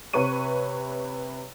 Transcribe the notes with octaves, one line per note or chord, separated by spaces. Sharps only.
C3 B4 C#5 C#6 D#7